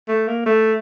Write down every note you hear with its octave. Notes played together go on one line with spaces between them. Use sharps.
A3
A#3
A3